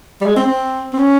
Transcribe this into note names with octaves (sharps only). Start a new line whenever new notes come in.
G3
G#3
C4
C4
C4
C#4